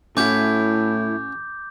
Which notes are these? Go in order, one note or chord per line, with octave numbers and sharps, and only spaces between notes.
A2 A3 C#4 E4 F#4 D6 G6